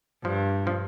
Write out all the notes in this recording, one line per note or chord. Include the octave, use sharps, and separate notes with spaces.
G2 F3
F3